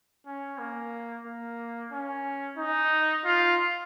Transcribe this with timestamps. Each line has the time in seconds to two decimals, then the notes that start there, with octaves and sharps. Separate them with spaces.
0.26 C#4
0.58 A#3
1.25 A#3
1.92 C#4
2.57 D#4
3.25 F4